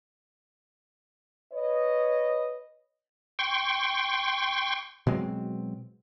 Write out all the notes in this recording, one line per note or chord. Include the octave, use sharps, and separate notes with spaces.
B4 C#5 D#5
G5 C6 C#6
B2 F#3 G#3 C4